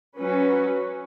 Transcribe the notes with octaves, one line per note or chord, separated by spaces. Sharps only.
F#3 C#4 F#4 B4